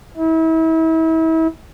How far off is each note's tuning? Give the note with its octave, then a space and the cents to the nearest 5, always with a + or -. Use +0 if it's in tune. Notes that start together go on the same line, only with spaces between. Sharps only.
E4 -35